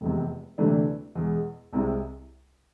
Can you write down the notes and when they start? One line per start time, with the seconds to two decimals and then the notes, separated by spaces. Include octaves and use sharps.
0.01 F1 E2 C3
0.58 D2 C3 E3 A3 D4
1.15 E2 B2 G#3
1.73 C2 C3 G#3 C4 E4